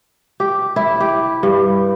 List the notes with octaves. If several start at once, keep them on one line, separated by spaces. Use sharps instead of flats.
G4
E4
G4
G2